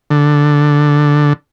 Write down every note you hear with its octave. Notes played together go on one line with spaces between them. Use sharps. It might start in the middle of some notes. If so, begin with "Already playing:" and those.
D3